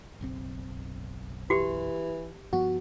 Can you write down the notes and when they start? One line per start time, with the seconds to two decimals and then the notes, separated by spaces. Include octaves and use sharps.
0.21 F#1 B1 C4
1.50 E3 F#4 G4
2.53 G2 F3 B3 F#4